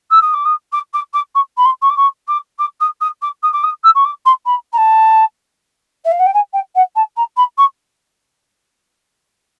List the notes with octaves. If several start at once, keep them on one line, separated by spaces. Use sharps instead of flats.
E6
D#6
D6
D#6
D6
D6
D6
C#6
B5
C6
C#6
D6
C#6
D6
D6
D#6
D#6
D6
D#6
D6
D#6
E6
C#6
D6
C6
B5
A#5
A5
E5
F5
F#5
G5
G#5
G5
F#5
A5
A#5
B5
C#6